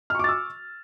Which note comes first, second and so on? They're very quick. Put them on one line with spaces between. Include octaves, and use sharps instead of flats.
F6 C#6 D6 A6 E6